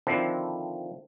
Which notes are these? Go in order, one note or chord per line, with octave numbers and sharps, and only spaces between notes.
D3 D#3 F3 C4 D4 E4